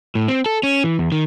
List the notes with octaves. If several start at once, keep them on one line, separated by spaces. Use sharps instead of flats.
A2
C4
A4
C#4
E3
E2
D#3